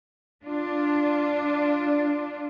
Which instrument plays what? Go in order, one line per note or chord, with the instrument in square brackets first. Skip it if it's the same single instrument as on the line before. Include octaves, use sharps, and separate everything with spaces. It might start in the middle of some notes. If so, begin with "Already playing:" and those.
[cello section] D4 F4